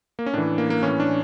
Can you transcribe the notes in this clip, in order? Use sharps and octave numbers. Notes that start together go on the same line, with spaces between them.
A#3
C#4
A2 E3 D4
A#3
A#3
A2 E3 C#4
D4